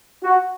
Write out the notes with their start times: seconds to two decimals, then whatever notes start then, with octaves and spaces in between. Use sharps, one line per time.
0.23 F#4